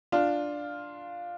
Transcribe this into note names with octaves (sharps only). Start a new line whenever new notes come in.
D4 F4